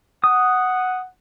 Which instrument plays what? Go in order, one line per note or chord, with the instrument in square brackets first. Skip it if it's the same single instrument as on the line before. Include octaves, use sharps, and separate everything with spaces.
[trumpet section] F#5 [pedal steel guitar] D#6